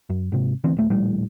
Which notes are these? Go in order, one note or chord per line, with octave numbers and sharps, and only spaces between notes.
F#2
G#2 C3
D2 E3 C4
D#1 A3
D#1 A#1 A2 G3